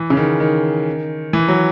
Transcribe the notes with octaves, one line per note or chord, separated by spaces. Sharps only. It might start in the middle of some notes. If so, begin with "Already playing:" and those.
Already playing: E3
C#3
D#3
D#3
E3
F#3